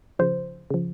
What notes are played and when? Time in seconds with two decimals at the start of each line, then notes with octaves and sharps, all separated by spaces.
0.19 C#3 F3 C5
0.71 C#3 F3